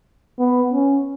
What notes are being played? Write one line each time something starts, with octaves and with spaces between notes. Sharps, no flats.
B3
C#4